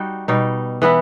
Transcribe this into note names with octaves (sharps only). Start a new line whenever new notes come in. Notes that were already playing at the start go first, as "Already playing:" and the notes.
Already playing: G3 D#4 F#4
B2 G3 D#4
E3 B3 E4